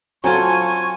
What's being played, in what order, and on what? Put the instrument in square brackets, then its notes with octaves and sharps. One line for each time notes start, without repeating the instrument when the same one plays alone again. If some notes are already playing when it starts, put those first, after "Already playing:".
[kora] F#3 F4 [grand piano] C4 A4 A5 [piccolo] G#5 [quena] C#6